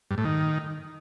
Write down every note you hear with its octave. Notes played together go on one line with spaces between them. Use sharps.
G2
A2
D#3